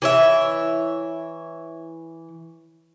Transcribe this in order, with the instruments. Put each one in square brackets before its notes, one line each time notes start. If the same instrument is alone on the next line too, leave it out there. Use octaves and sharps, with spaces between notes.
[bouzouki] E3 C#5 E5